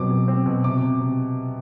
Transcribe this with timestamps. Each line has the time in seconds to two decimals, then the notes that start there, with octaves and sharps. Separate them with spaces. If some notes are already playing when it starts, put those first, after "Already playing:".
Already playing: B2 F#3 C4 D6
0.11 B2
0.28 C4
0.46 B2
0.64 C3 D6
0.82 C3
1.00 C3